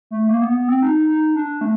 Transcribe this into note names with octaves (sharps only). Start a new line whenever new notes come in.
A3
A#3
B3
B3
C4
D#4
D#4
D4
A3